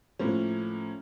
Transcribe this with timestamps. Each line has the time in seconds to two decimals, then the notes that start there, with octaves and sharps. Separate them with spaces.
0.19 A2 F3 A#3 C#4